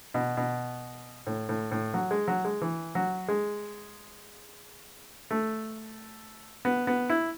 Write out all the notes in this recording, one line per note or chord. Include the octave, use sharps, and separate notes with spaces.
B2
B2
A2
A2
A2
F#3
G#3
F#3
G#3
E3
F#3
G#3
A3
B3
B3
E4